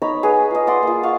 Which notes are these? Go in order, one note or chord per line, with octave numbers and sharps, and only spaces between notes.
D#4 C#5 A#5 B5
G#4 B4 F#5
F4 D#5
D5 F#5 C6
A#3 F4
F5 F#5 C#6